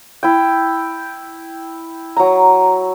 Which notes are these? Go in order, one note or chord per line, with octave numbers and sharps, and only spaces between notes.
E4 G5
F#3 A#5